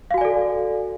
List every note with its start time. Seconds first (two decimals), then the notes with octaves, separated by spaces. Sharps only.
0.11 F5
0.14 F#4
0.18 G#5
0.21 D5
0.25 A4